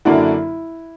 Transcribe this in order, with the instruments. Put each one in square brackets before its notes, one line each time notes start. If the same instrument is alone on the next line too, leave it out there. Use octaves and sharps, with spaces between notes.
[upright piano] F#2 D3 A#3 D4 F#4 [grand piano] E4